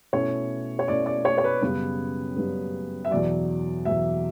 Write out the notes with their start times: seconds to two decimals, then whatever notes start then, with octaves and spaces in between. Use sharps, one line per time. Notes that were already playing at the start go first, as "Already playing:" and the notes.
0.13 B2 A3 C#4 E4 C#5
0.79 C#5
0.88 B2 A3 C#4 E4 D5
1.06 D5
1.25 C#5
1.38 C#5
1.44 B4
1.62 F#2 C#3 G3 B3 B4
2.36 F#2 C#3 G3 B3
3.05 E5
3.11 E2 B2 F#3 D5
3.85 E2 B2 F#3 E5